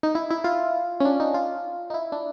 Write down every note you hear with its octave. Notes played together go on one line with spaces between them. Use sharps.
D#4
E4
E4
F4
C#4
D4
D#4
F4
D#4
E4
D4